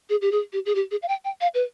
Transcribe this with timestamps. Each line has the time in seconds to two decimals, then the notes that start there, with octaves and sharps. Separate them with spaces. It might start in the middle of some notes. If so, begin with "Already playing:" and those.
0.10 G#4
0.22 G4
0.32 G#4
0.53 G4
0.66 G#4
0.75 G4
0.91 G#4
1.02 F5
1.08 G5
1.25 G5
1.41 F5
1.54 B4